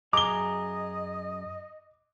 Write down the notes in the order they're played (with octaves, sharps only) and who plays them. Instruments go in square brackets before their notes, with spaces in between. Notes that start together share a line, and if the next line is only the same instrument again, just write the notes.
[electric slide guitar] F#2 G#4 A#5 [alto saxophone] D#5 [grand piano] D6 G7